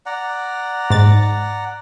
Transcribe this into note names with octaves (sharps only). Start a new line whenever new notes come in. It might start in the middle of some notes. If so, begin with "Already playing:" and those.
D5 F#5 A#5
G#2 A6